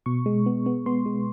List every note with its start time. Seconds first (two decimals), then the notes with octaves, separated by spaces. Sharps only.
0.06 B2 C#6
0.26 G#3
0.46 B3
0.66 B3
0.86 B3 C6
1.06 G#3